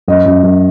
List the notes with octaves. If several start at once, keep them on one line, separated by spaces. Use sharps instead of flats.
F#2 D#5
F#2
F#2